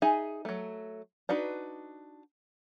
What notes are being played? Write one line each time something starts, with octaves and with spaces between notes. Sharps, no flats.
D#4 G#4 E5 G#5
F#3 A3
D4 D#4 F#4 B4